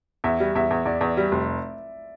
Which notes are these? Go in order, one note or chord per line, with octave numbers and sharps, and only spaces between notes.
E2 E5
G3
E2 E5
E2
E2 D5
E2
G3
F1